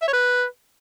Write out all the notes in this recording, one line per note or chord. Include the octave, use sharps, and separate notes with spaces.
E5
C#5
B4